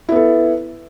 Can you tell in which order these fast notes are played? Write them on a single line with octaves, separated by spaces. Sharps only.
E4 B3 A4